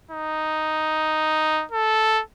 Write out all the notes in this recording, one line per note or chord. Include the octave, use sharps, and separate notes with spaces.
D#4
A4